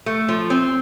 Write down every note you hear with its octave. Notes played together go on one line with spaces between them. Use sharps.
A3
F3
C4